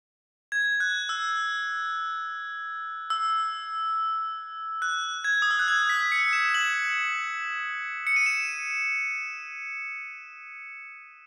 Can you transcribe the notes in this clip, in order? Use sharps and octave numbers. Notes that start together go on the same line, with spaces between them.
G#6
F#6
E6
E6
F#6
G#6
D#6
E6
F#6
G#6
B6
C#7
E7
E7
F#7
C#7
D#7
E7